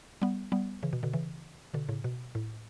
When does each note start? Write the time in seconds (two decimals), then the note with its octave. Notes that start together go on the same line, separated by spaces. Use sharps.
0.22 G3 B3
0.52 G3 B3
0.83 C#3 E3
0.93 B2
1.03 B2 D3
1.13 C#3 E3
1.74 B2 D3
1.89 A2 C#3
2.04 B2
2.35 A2